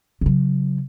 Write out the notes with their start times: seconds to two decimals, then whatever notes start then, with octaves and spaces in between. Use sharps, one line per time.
0.21 C#3 F#3